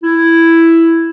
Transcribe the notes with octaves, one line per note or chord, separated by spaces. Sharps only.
E4